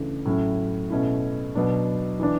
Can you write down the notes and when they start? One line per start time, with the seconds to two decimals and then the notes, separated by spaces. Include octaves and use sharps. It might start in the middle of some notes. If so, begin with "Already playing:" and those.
Already playing: C#3 E3 A3 D4
0.25 A2 F#3 C#4 E4
0.90 B2 A3 C#4 E4
1.55 B2 F#3 B3 D4
2.20 E3 B3 D4